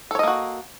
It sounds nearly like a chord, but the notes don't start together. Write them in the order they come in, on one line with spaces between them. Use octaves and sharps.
A4 C#5 D#5 A#3 F#4